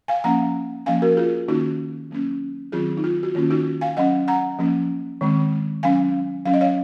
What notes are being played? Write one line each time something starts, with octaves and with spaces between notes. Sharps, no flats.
F5 G#5
F3 A#3 C#4 F#5 A#5
F3 A#3 C#4 F5 G#5
F#4 A#4
F4 G#4
D#3 A#3 C#4 D#4 F#4
F#3 A#3 C#4
D#3 F#3 C4 F4 G#4
D#4
F4
F#4
D#3 A#3 C#4 F4
D#4 F#4
F5 G#5
F#3 C#4 D#5 F#5
F#5 A#5
F3 A#3 C#4
D#3 G#3 C4
F#3 C#4 F5 G#5
F#3 C#4 F5
D#5
C#5 F5